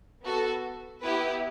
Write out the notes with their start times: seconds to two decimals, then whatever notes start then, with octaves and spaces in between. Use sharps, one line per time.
0.22 B3 F#4 A4
1.02 B3 E4 G4 B4